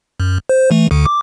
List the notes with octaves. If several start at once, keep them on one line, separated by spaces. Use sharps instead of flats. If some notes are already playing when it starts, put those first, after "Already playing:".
F#2
C5
E3 A3
D2 D3
D6